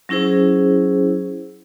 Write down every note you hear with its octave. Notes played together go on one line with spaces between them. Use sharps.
F#3 C#4 E4 G#4 C5